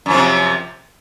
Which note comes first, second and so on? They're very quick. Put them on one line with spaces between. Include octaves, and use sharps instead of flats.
F#2 F3 C3